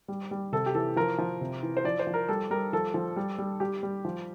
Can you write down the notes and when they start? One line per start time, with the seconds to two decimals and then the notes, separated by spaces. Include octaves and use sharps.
0.08 G3
0.31 G3
0.52 C3 A4
0.66 G4
0.75 E3 A4
0.96 F3 A#4
1.18 F3
1.41 C3
1.63 E3
1.77 C5
1.85 F3 D5
1.99 C5
2.07 F3
2.14 A#4
2.28 G3 A4
2.50 G3 A#4
2.73 F3 A4
2.94 F3
3.16 G3
3.38 G3
3.60 G3 G4
3.83 G3
4.05 F3